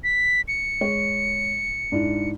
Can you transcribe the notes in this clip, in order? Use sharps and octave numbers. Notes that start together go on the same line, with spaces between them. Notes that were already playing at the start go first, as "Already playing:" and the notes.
B6
C#7
G#3 C#5
G#2 D4 E4